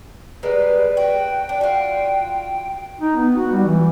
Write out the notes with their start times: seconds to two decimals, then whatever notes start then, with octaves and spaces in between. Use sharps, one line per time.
0.43 G3 G#3 A#3 B4
0.97 F#4 G5
1.49 D4
1.61 F4 F#4
3.01 D#4
3.16 B3
3.37 F#4
3.53 G3
3.66 E3